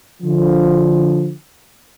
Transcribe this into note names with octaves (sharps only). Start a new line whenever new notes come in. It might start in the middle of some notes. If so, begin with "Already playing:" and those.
D3 F3